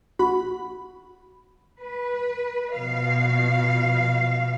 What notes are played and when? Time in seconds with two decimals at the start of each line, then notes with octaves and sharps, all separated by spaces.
0.19 A#1 F#4 B5
1.80 B4
2.73 B2 F3 F5